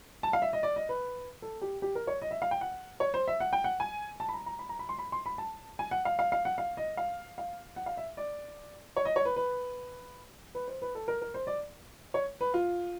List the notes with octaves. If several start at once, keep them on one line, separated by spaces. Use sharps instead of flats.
A5
F5
E5
D#5
D5
D#5
B4
A4
G4
G4
A#4
C#5
D#5
E5
F5
G5
F#5
C#5
C5
E5
F#5
G5
F#5
G#5
A5
B5
A#5
A#5
B5
A#5
B5
C6
B5
C6
B5
A5
G#5
F#5
F5
F5
F5
F#5
F5
D#5
F5
F5
F#5
F5
E5
D5
C#5
D#5
C#5
B4
B4
B4
C5
B4
A4
A#4
A#4
C5
D5
C#5
B4
F4